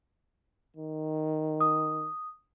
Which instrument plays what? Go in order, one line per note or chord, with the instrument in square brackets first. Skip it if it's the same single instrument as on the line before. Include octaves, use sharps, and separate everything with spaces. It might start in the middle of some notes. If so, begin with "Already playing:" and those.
[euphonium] D#3
[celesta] D#6